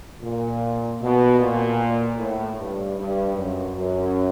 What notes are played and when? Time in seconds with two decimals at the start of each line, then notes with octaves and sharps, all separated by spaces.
0.22 A#2
1.01 B2
1.39 A#2
2.18 A2
2.57 G2
2.97 G2
3.36 F#2
3.74 F#2